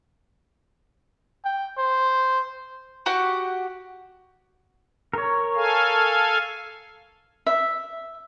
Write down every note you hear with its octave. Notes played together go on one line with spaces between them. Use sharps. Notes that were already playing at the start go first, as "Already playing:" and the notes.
G5
C5
F#4 G4 F#5
A#4 C#5
A4 F5 G#5
E5